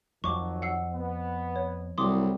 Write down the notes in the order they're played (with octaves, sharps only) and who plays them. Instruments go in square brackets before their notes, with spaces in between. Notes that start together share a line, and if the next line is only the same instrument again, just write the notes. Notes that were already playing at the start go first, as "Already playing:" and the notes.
[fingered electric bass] F2 [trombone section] D#3 F#3 [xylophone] C#6 D6
[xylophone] F#5 E6 C7
[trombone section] B3
[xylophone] C#5
[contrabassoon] C2 [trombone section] A2 F#3 G3 [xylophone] C6 D6 D#6